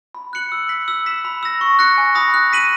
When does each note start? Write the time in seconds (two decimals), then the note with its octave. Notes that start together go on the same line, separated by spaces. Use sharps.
0.15 B5
0.33 F#6 C#7 F#7
0.52 E6
0.69 B6 F#7
0.88 E6
1.06 B6 E7
1.25 B5
1.43 E6 A#6
1.61 C#6
1.79 F#6 A#6 C#7
1.98 G#5
2.15 B5 D#6 A#6
2.34 F#6
2.53 B6 D#7 F#7